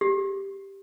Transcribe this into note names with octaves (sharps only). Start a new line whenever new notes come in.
G4